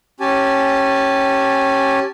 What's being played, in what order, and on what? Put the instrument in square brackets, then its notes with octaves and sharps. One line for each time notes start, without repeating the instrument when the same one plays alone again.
[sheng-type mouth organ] C#4 G4 G#5 A5